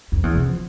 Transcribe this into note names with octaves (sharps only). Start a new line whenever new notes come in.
F2
E2
B2
F3